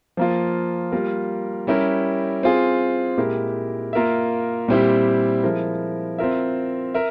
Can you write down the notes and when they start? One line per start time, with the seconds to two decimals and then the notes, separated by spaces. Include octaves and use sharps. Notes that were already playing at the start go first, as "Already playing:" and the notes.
0.17 F3 A#3 F4
0.92 G3 A#3 F4 A#4
1.67 G3 C#4 E4 G4 A#4
2.43 C4 F4 G#4
3.18 A#2 G#3 E4 G4 A#4
3.93 A#3 F4 A#4 E5
4.68 A#2 G3 C4 E4 G4
5.43 F3 G#3 E4 A#4
6.18 C4 F4 A#4 E5
6.94 A#4 E5